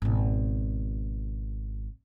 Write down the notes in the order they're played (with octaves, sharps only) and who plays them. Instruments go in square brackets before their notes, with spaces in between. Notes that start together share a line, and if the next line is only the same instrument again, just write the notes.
[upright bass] G#1 B2